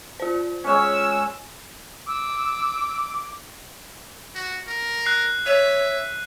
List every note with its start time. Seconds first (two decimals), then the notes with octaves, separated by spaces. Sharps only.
0.20 F4 C5
0.64 G#3 C#4 C#5 E6
2.07 D6 E6
4.35 F#4
4.67 A#4
5.06 F#6 C7
5.46 C#5 E5 D#7